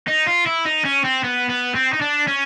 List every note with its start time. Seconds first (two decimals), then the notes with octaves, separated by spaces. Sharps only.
0.08 D#4
0.27 F4
0.47 E4
0.66 D#4
0.85 C#4
1.05 C4
1.24 B3
1.50 B3
1.76 C4
1.94 D#4
2.02 D4
2.28 C#4